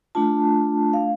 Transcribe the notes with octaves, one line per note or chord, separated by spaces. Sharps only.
A3 D4 F4 A5
F5